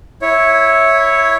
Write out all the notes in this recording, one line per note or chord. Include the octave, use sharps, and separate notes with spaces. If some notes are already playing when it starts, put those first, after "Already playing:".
E4 C#5